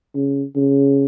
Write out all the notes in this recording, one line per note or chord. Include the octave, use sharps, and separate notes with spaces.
C#3
C#3